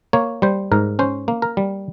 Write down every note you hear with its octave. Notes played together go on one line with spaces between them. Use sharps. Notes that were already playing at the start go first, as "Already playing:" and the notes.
A#3 C#5
G3 C5
G#2 A#4
C#4 C5
A#3
A#4
G3